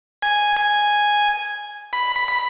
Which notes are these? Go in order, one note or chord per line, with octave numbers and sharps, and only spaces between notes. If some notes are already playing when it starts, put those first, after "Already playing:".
G#5
G#5
B5
B5
B5